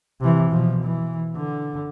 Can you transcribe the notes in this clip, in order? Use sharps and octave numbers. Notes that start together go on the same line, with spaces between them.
C3 E3
B2 F3
E3
D3